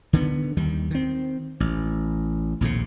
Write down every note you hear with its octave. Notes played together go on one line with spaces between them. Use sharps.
D3 D#3 B3
D#2 D#3 G3
D#3 C4
A1
A#1 D#2 A2 C3